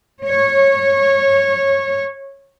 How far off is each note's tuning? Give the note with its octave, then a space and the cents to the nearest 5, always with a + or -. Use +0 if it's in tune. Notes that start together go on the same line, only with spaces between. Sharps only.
C#5 -20